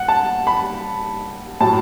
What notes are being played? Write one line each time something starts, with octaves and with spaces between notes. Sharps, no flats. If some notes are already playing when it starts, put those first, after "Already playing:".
Already playing: F#5
A5
B5
A2 F#3 A5